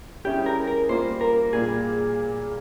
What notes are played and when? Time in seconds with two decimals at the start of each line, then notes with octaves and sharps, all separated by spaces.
0.24 G3 C#4 E4 G4 G#4
0.46 A#4
0.67 A#4
0.89 G3 A#3 F4 C5
1.21 A#4
1.53 A#2 G3 A#3 F4 G#4